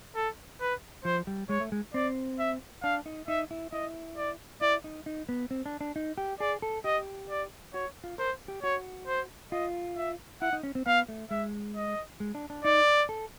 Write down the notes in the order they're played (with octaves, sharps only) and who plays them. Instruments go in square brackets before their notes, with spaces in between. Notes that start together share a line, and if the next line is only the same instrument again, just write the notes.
[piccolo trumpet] A4
B4
[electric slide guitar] F3 [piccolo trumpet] C5
[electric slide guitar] G3
[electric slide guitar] G#3 [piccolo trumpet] C#5
[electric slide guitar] A3
G#3
[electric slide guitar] C4 [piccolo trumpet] D5
[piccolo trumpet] E5
[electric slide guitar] D4 [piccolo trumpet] F5
[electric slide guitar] D#4
[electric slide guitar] D#4 [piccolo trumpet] E5
[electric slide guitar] E4
[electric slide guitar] E4 [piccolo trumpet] D#5
[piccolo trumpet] D5
[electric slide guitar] E4 [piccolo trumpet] D5
[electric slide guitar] D#4
D#4
B3
C4
D4
D4
D#4
G4
[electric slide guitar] G#4 [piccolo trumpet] D5
[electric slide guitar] A4
[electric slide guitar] G4 [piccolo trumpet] D#5
[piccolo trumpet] D5
[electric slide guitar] F#4 [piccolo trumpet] C#5
[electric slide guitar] F4
[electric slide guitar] A#4 [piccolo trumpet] C5
[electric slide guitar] G4
[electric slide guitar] F#4 [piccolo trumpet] C#5
[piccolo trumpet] C5
[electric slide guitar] F4 [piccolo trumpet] D#5
[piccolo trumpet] E5
[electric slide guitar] E4 [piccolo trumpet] F#5
[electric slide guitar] D#4
C#4
C4
[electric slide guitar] B3 [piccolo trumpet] F5
[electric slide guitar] A3
[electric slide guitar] G#3 [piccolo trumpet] E5
[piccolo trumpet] D#5
[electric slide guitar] G#3
D4
D4
[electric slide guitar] D#4 [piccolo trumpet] D5
[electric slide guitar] A4